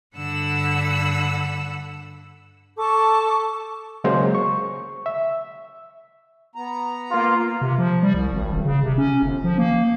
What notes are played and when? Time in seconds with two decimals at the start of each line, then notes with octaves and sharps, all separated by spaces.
0.17 G2 D3 F#5 B5 E6
2.77 A4 A5 C#6 D6
4.04 C#3 F#3 G#3 A#3 C5
4.35 C#6
5.06 E5
6.55 B3 A#5
7.11 A#3 F4
7.62 C3
7.78 F3
8.03 G3
8.14 C2
8.33 G#1
8.53 D#1
8.65 C#3
8.83 C3
8.98 C#4
9.23 G1
9.44 F3
9.58 A#3